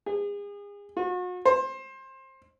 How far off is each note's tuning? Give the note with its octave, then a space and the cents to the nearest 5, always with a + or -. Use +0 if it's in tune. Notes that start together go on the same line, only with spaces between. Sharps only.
G#4 -35
F#4 -40
C5 +25